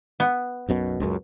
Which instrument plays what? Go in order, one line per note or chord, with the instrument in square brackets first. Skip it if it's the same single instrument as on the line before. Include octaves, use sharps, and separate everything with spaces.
[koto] B3
[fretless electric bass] B1 F#2 B2
C#2 F#2